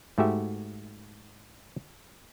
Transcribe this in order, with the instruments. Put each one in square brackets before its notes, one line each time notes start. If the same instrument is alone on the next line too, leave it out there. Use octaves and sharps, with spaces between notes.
[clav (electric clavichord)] G#2 A3 F#4 G4 E5